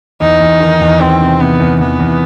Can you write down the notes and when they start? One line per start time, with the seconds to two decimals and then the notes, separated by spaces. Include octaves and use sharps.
0.20 E2 D#4
0.40 E2
0.60 D#3
0.80 E2
1.00 E2 C4
1.21 C3
1.40 C3 B3
1.60 E2
1.79 E2 B3
1.99 E2